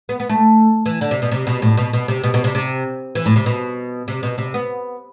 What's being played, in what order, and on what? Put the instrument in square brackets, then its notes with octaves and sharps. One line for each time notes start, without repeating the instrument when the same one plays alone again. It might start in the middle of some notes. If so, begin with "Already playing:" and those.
[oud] B3
B3
A3
E3
D3
C3
B2
C3
B2
A2
B2
B2
C3
B2
B2
C3
C3
E3
A2
C3
B2
C3
B2
C3
B3